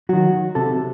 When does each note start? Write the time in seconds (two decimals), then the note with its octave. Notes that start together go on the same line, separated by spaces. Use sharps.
0.09 D#3 F#3 F#4
0.55 C3 A4